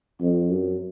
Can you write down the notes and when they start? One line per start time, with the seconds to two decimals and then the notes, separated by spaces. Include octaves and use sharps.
0.20 F2
0.50 F#2